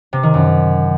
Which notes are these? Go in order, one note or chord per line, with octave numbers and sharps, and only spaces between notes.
C3
D#3
F#2